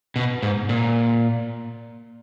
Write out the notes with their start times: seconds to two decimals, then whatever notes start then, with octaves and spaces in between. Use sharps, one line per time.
0.16 B2
0.43 G#2
0.69 A#2